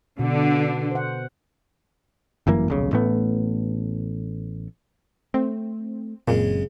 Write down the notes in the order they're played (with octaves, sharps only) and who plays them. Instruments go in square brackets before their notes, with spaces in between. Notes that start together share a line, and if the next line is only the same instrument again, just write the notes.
[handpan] B2 [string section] D3
[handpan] C5 F#5
[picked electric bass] G1 F#2 E3 A#3
D#1 B1 C#3
A1 A2 A3 B3
[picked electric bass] A3 [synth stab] C4
[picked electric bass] F#1 F#2 C4 [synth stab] A#2 [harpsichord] C#3 G#3